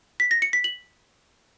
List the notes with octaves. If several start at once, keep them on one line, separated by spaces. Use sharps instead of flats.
B6
A#6
C#7
B6
F#7